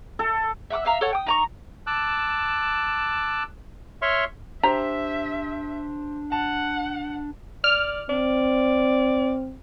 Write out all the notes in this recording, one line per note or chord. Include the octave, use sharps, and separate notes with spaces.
A4
E5 F#5 D6 E6
E5 F5 A#5
A4 C#5 F#5
G5 D#6
D#4 A#5 C#6
A5 D6 E6 F#6
C#5 E5 C6 C#6 F6
D4 G4 C5 E5 A#5 B6
F#5 A5
D5 F6
C4 D5